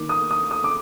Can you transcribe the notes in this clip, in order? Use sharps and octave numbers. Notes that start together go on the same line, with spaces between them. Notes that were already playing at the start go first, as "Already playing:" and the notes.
Already playing: D#3 A#3 D6
D#6
D#6
D#6
D6